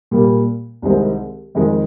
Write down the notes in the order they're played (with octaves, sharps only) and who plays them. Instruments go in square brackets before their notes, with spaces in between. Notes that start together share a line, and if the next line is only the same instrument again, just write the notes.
[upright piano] A#2 G3 A#3
C2 C3 D#3 G#3 C4
F2 D#3 G#3